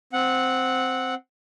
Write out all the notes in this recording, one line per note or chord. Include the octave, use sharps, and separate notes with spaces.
C4 F#5